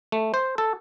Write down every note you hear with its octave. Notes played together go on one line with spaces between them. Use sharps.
A3
C5
A4